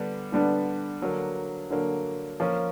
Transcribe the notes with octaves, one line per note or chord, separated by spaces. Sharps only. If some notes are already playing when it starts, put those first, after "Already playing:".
Already playing: D3 G3 B3 D4
D3 G3 B3 D4
D3 F#3 A#3
D3 F#3 A#3
F3 A#3 C#4